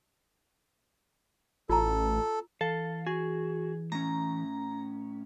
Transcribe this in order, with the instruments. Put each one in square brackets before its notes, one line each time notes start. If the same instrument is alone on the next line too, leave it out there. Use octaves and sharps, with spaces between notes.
[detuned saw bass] A1 [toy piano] F4 A#5 [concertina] A4
[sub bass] E3 [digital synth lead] A4 [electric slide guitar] F5
[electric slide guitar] F#4 [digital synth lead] G#4
[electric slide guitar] A2 C#4 [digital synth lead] A#5